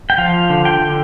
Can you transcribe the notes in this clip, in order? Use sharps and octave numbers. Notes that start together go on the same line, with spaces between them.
G5
F3 F5
D3
G5
D3